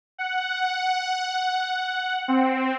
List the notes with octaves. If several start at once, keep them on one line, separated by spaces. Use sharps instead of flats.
F#5
C4